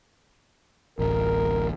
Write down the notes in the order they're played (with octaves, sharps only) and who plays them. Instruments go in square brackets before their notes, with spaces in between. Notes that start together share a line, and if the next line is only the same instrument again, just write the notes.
[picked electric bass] D1 A1 [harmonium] A#4